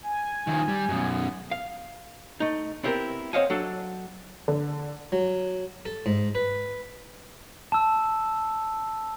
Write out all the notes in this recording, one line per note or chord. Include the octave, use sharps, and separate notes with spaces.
G#5
D#3 F3
G3
F#2 B2
F5
A3 D#4
B3 C4 E4 G4 G#4 A#4
C4 C#5 D#5 F5 F#5 G#5
F#3 D4 A4
D3
F#3
A4
G#2
B4
A5 E6